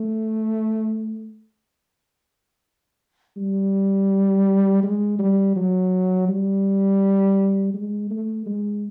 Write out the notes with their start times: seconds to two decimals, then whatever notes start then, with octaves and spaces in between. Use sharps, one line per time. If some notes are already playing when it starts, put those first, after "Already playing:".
Already playing: A3
3.37 G3
4.83 G#3
5.19 G3
5.56 F#3
6.29 G3
7.74 G#3
8.10 A3
8.46 G#3